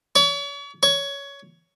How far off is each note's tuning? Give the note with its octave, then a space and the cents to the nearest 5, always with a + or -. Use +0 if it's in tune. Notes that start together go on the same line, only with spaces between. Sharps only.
C#5 +40
C#5 +15